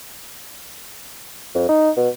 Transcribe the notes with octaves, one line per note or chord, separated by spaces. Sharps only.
F2
D#4
B2